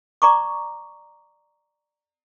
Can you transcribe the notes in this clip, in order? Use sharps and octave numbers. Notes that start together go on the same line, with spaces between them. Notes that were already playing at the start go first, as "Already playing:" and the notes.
D5 A#5 C#6 D6